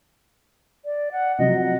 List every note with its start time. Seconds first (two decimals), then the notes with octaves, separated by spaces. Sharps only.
0.85 D5
1.12 F#5
1.39 C3 F3 F#3 D#5
1.61 F#5